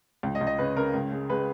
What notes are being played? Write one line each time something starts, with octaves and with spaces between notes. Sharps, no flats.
C#2
D#5
C#2
D#5
C#3 B4
C#3 A#4
C#2
G#3
G#3 B4